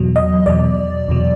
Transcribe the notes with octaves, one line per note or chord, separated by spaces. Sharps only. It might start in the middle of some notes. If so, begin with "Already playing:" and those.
Already playing: E2 B2 F#3
D#5
E2 B2 F#3 D5
E2 B2 F#3